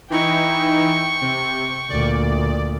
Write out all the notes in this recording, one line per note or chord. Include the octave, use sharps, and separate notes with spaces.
E3 D#4 E4 G5 C#6
C3
D2 A#2 D5